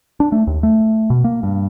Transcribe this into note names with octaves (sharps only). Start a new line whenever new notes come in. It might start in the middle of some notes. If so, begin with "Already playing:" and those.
D4
A3
D#2
A3
B2
A#3
G2